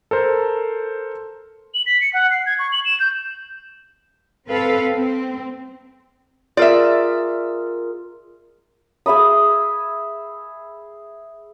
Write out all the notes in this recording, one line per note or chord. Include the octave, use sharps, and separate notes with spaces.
A4 A#4 C5
F#7
B6
C#7
F#5
C7
G#6
C#6
F#7
E7
G6
C4 A4 B4 F5
C4
F4 G#4 A#4 D5 E5
G#4 E5 B5 D#6